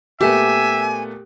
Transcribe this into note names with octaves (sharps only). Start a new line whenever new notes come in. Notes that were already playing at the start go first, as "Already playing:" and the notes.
A#2 A3 B3 G4 E5 G#5